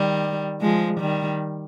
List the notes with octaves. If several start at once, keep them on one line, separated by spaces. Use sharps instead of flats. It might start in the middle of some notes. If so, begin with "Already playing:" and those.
Already playing: D#3 G3
F3 G#3
D#3 G3